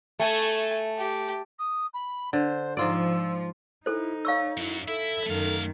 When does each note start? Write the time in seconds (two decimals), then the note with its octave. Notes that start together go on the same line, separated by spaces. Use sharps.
0.20 A3 A4 G#5
0.98 G4
1.59 D#6
1.94 B5
2.33 D3 C5
2.77 G#2 F3 F4 D5 E6
3.86 D#4 E4 A4 C5
4.25 C#5 F5 C#6 E6
4.57 F#2 F#3 E4
4.88 E4 A4 E5
5.26 F#2 D#3 A3 F5